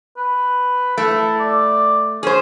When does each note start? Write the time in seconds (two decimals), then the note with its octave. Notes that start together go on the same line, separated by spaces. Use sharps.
0.17 B4
0.98 A3 E4
1.40 D5
2.23 C#4 G#4 C5